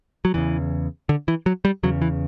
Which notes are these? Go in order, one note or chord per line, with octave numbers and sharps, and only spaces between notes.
F#3
E2 C#3 E3
D3
E3
F#3
G3
E2 C#3 F#3
E3